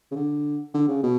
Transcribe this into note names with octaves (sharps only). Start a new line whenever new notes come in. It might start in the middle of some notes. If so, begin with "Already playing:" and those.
C#3
D3
D3
C#3
B2